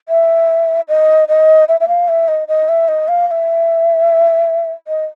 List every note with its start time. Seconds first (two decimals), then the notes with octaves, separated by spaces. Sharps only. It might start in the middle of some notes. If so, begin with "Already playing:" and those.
0.09 E5
0.88 D#5
1.28 D#5
1.68 E5
1.80 E5
1.88 F5
2.08 E5
2.28 D#5
2.48 D#5
2.69 E5
2.88 D#5
3.08 F5
3.28 F5
3.31 E5
4.88 D#5